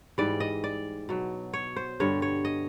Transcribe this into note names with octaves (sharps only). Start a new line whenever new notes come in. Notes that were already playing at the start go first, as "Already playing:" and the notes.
G#2 E3 G3 D5
D#5
D5
B2 F#3
C#5
C5
G2 D3 G3 C#5
C#5
D#5